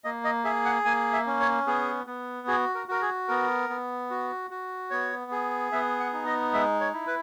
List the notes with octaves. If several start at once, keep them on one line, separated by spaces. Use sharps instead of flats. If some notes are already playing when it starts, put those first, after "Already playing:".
A#3 D#5
D#5
G#4 E5
F#5
A#3 G#5
E5
C#4
C#5
B3 G#4
B3
F#4 G#4
A#4
F#4 A#4
G#4
B3 A#4
B3
F#4
F#4
B3 C#5
G#4
B3 E5
F#5
D#4
D#5
G#3 E5
C#5
E4
B4